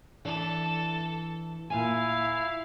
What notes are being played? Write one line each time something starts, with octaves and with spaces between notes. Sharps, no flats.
E3 D4 A4
A#2 E4 F5 G#5